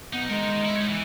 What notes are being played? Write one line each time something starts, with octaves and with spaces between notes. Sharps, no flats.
B1 B3 D#4
G#3 D#4 A#4
E4
D#4 C#5
E3